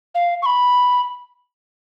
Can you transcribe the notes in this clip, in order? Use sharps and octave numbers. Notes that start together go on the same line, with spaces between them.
F5
C#6
B5